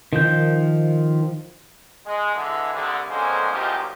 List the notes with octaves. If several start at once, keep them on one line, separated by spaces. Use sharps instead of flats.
D#3 F3 G6
G#3
D3 E3 G#3
C2 D3
F2 D3 G#3 A#3 C#4 C5
C#2 F#2 A#2 F3 D#4 G4